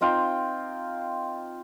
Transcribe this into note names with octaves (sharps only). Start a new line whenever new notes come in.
C4 D#4 F4 G5